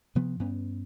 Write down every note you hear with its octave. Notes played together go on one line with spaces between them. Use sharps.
C3 F3 B3
G2 B3 C#4